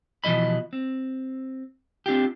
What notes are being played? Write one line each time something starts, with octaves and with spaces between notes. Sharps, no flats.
B2 E3 F3 D#5 B5
C4
C4 D4 F4 G4